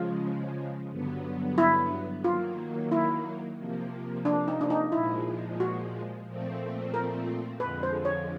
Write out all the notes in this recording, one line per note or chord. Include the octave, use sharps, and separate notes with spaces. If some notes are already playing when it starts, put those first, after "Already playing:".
Already playing: C#3 F3 G#3 F4
G2 D3 F#3 B3
E4
D#3 F#3 A#3 F4
E4
C3 F3 A#3
D4
D#4
D4
D#4
A#2 F3 G#3 E4
F#4
A#2 F3 A3 C4
A#4
F2 D3 F3 G#3 B4
C5
C#5